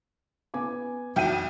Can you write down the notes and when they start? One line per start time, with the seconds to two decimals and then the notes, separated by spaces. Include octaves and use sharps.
0.54 B3 G#5 D6
1.16 B1 F2 E5 F#5 G5 D#7